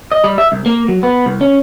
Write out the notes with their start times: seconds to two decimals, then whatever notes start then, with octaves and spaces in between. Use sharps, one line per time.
0.12 D#5
0.24 G3
0.38 E5
0.52 C2
0.66 A#3
0.88 F#3
1.03 B3
1.26 C2
1.41 C#4